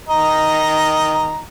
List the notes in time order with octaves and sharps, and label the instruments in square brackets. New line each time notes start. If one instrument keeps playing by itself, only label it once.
[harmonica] D#3 D#5 A#5